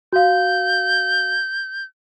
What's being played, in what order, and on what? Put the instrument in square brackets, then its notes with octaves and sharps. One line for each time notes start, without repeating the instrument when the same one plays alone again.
[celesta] F#4 F5 [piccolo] G6